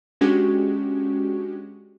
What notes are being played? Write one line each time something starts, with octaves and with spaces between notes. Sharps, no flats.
G#3 C#4 D4 F#4 G4